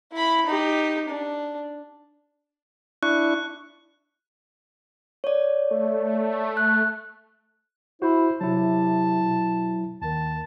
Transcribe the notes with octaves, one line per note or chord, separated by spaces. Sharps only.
E4 B5
D#4 G4
D4
D4 E4 C#6 F#6
C#5 D5
A3
F#6
E4 F#4 C5
C3 F#3 E4 A5
B2
D#2 D#3 A5